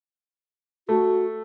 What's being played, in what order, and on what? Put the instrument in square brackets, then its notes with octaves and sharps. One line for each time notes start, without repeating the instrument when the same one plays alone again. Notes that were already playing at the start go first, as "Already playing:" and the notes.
[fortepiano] A3 [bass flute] F#4